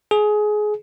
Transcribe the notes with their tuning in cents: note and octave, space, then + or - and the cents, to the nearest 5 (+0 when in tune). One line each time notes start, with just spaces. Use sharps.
G#4 +20